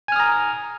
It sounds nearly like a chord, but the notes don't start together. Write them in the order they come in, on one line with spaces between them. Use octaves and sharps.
G#5 F6 D#6 A#5